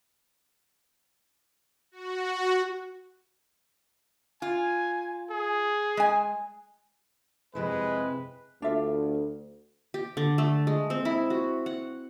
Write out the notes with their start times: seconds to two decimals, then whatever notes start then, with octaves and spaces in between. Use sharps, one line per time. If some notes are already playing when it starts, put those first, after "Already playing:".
1.92 F#4
4.42 F4 G#5
5.30 G#4
5.97 G#3 G#5
7.55 F2 C3 G#3 E4 B4
8.62 D2 D4 F4 E5
9.94 G4
10.17 D3
10.38 A3
10.67 G#3
10.90 C4
11.05 E4
11.30 F#4
11.66 F#5